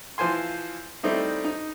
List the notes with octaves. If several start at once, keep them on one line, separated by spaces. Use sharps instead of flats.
E3 F3 C5 G#5 C6
G3 A3 C4 D#4 E4
D#4